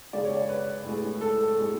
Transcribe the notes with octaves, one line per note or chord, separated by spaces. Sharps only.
C#3 G#3 D5
C#5
D5
B4
A2 G#3
A4
A2 G#3